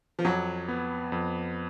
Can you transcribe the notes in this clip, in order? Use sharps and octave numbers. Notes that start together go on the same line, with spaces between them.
F3
F2 F#3
B3
F2